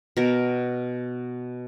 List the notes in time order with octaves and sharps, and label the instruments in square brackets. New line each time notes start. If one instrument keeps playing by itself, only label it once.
[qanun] B2 A#4